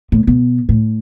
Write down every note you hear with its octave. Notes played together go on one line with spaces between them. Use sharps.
A2
B2
A2